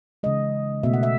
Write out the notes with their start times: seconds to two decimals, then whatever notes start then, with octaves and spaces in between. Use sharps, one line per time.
0.23 C#3 E3 G#3 D#5
0.83 B2 A3 E5
0.94 F#5
1.03 E5